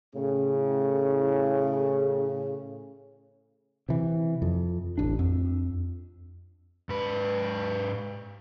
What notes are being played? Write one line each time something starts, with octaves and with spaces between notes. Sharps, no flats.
A2 C#3
C3 E3
F2
D1 A1 D4
F2
G#2 B4